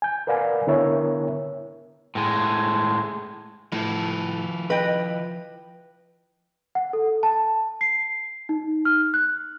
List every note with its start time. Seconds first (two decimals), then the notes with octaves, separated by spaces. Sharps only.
0.02 G#5 G6
0.27 A#4 B4 D5 F5 F#5 G#5
0.67 D3 B3 E4 A#4 C#5 E5
2.15 A2 G#3
3.72 A2 F3 E4
4.70 B4 D#5 G5
6.75 F#5
6.93 A4
7.23 A5
7.81 C7
8.49 D#4
8.85 F6
9.14 F#6